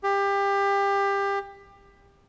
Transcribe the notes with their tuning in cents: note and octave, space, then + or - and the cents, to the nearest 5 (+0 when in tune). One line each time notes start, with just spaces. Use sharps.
G4 +25